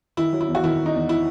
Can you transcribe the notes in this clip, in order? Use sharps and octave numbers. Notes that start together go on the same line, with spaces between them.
D#3 E4
F#3
E4
E2
F#4
D#3 E4
D#3
D#4
E2
E4